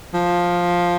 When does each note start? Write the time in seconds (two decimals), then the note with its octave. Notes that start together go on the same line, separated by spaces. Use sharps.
0.14 F3